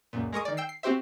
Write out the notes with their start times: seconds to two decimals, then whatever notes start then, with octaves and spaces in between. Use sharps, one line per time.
0.13 C#2 F#2 A#2
0.33 G#3 A#4 C#6 D#6
0.45 D#3 D5
0.57 G5 E6 C7
0.69 C7
0.83 C4 F#4 G4 C5 E5